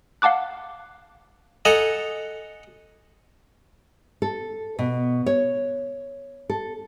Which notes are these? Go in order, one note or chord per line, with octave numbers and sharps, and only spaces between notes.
F5 F#5 A5 D6 F#6
A4 D#5 F#5 G#5 A#5
A4
B2
C#5
A4